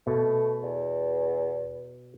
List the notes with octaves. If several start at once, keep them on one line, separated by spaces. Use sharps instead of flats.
B2 A3
E2